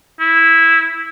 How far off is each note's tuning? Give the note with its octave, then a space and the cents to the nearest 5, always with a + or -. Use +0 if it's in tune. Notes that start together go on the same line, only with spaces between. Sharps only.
E4 -5